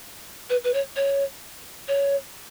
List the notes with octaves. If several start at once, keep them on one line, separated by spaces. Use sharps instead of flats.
B4
B4
C#5
C#5
C#5